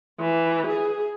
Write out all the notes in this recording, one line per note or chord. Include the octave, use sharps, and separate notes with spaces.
E3
G#4